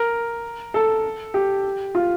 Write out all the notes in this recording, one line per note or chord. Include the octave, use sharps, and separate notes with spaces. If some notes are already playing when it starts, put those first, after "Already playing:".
Already playing: A#4
A4
G4
F4